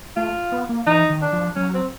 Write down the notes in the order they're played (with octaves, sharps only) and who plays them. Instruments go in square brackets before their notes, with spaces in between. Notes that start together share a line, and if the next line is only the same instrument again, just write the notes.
[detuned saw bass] A3 [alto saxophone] F4
[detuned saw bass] B3
A#3
[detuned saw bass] E3 [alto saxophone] D#4
[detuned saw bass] D#3
[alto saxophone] D4
[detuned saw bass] F3
[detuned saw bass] F#3 [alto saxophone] C#4
[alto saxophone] C4